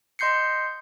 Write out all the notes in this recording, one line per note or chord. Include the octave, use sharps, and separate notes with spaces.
D#5 C6 G6 C7 C#7